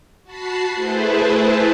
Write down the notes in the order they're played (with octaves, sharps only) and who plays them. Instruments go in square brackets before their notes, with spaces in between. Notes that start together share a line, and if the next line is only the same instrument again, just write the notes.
[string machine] F#4 A5 B5 C7
A3 E4 G#4 A4 B4 C5